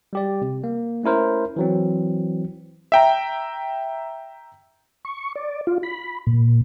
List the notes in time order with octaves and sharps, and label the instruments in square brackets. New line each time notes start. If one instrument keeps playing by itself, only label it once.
[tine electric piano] G3 G4 D5
C3
A#3
A3 C#4 E4 A#4 C5
E3 F#3 C4
[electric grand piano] E5 G5 A#5
[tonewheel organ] C#6
D5
F4
B5
A#2